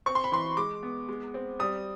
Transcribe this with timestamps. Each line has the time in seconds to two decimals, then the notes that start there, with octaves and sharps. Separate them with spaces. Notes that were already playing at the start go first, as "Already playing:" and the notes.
0.06 C4 C#6
0.15 C6
0.24 B5
0.32 E3 C6
0.57 G#3 D6
0.83 B3
1.09 G#3
1.34 C4
1.60 G3 D#6